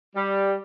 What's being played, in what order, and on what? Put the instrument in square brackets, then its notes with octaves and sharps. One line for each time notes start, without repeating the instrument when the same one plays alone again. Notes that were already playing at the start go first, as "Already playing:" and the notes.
[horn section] G3